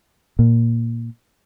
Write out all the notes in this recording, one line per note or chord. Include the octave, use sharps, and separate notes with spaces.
A#2